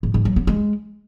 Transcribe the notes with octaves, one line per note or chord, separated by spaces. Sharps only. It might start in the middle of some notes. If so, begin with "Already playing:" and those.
G#2
G#2
F#3
B3
G#3